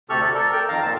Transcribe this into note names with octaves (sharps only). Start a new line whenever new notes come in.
D2 C3 G4 A4 C#6 F6
D5
A4 A#4
A#4 G5
F2 D#3 F5 A#5
A#2 A5